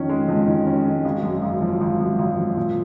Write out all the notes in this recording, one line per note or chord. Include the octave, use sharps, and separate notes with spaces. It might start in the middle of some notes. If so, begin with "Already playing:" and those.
Already playing: F2 D#3 C#4
G#3
F2
D#3
C#4
G#3
G#1
F#2
G#1
F3
G#1
F#2
G#1
F3
A#2